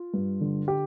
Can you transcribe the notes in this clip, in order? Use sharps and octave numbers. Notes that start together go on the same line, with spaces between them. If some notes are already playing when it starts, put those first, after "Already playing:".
Already playing: F4
G2
D3
G4